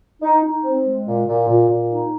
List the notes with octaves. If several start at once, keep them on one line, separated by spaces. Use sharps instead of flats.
D#4
D#4
C4
G#3
A#2
A#2
A#2
A#2
D#4